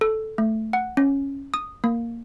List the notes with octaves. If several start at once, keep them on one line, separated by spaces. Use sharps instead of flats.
A4
A3
F#5
C#4
D#6
A#3